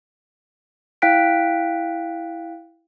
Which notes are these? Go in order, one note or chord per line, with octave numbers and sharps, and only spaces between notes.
E4 F5 G5 F#6 B6 D7